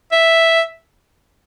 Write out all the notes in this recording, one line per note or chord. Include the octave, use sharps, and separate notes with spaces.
E5